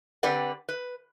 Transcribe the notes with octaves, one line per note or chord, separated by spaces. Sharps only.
D3 C4 G4 B4 D5 F#5
B4